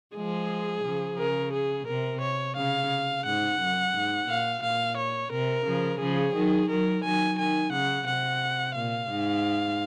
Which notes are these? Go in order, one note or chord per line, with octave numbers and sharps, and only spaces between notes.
F3 G#3 G#4
C#3 F3
C#3 A#4
G#4
C3 A#4
C#5
C#3 F5
G#2 F#5
F#2
G#2
A#2 F5
A#2 F5
C#5
C3 A#4
C#3 F3
C#3 F3 G#4
D#3 F#3
D#3 F#3 A#4
D#3 F#3 G#5
D#3 G#5
C#3 F#5
C3 F#5
A#2 F5
G#2